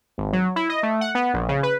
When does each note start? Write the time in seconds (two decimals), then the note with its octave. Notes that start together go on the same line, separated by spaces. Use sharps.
0.18 G#1
0.33 F#3
0.56 E4
0.69 D#5
0.83 A3
1.01 F#5
1.15 B3
1.34 A#1
1.49 C#3
1.63 B4